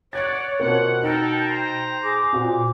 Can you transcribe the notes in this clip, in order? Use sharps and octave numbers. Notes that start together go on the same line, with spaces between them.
C#5 D5 F#5 F#6 G#6 A6
B2 A#3 C4 F4 F#5
D#4 A4 A#4 G5
C5 A#5
G#4 D6
A#2 C4 F#4 C5